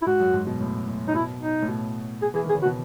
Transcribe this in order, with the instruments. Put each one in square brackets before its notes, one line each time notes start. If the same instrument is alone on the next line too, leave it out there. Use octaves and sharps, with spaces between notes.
[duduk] E4
[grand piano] G#2 [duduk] F#4
[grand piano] F#2
G#2
B2
A2
A2
[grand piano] A2 [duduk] D#4
[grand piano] B2 [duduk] E4
[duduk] D#4
[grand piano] A2
B2
[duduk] G#4
[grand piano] E3 [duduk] G#4
[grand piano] D#3 [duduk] G#4
[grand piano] C#3
[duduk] F#4
[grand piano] B2